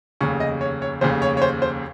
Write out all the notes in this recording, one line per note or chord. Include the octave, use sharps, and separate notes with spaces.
F1 D#2 C#3 C#6
D#5
C#5
C#5
F1 D#2 C#3 C5
C#5
C#5
C5
C5